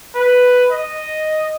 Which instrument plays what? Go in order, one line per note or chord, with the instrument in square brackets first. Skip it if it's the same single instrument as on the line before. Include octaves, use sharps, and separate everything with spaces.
[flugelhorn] B4
D#5